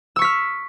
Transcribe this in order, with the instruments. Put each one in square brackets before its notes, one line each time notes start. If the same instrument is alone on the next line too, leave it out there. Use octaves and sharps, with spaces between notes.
[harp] E6
C#6
B6
F6